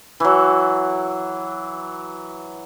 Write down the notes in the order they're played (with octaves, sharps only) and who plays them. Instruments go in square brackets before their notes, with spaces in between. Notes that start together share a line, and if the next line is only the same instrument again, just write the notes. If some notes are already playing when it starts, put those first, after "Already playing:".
[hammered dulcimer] E3 F#3